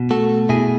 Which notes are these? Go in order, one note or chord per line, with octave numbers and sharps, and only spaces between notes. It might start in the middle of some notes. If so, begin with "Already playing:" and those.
Already playing: B2
A3 F#4 A4
B2 E4 G#4